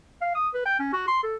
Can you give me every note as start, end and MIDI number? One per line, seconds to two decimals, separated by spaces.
0.22 0.31 77
0.35 0.48 87
0.54 0.62 71
0.66 0.76 79
0.79 0.88 61
0.93 1.06 66
1.07 1.19 84
1.23 1.36 69